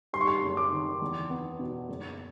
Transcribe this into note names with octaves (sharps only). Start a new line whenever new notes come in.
G3 C6
C#6
C6
F#1
D6
D#3
E2
B3
B2
F#1